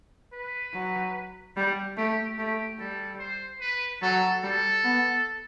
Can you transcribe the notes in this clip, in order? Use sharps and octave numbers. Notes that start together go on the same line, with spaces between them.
B4
F#3
G3
A3 G4
A3 G4
G3 A4
C5
B4
F#3 A4
G3 A4
B3